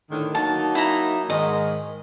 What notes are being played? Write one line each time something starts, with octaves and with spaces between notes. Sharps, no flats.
A2 D3 D#3
F#3 A#3 D#4 A5
E4 A#5
G#2 D#3 D#5